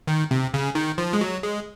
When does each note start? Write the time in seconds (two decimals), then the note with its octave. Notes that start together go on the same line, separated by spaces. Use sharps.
0.07 D#3
0.31 C3
0.54 C#3
0.75 D#3
0.98 F3
1.13 G#3
1.21 F#3
1.43 G#3